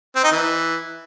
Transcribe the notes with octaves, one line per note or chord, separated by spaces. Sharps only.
C4
D#4
E3